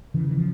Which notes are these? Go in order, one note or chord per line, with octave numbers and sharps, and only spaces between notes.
C#3 E3
E3
F3